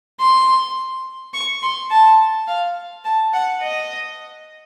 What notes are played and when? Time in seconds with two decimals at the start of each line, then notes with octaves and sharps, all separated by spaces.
0.20 C6
1.34 C#6
1.63 C6
1.91 A5
2.48 F5
3.05 A5
3.33 F#5
3.61 D#5